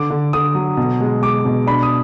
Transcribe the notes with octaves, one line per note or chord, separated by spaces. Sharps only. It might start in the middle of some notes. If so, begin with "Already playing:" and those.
Already playing: D3 D6
D3
D3 D#6
F#3
B2
G#3
G#3 D6
B2
D4 B5
D#6